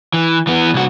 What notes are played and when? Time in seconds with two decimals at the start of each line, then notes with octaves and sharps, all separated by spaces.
0.14 E3
0.47 E3 B3
0.74 C2 F#4